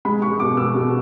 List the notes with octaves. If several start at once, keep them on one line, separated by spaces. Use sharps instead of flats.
G#3 B5
G#3 C#6
B2 D6
G#3 E6
B2